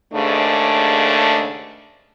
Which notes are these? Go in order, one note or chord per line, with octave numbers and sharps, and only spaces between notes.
D#2 G#2 C#3 A3 D4